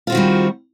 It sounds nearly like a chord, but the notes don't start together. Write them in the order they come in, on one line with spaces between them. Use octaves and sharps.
F4 C4 F#4 D#3 G3